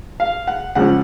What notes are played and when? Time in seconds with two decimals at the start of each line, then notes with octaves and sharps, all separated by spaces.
0.20 F5
0.47 F#5
0.75 C#2 C#3 F3 F#5